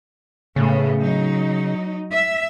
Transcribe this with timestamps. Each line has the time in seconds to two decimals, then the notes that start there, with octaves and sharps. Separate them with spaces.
0.56 A2 C#3 A3 B3
0.99 F#3 D#4
2.12 E5